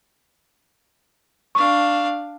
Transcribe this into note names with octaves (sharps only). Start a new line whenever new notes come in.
D4 F5 C#6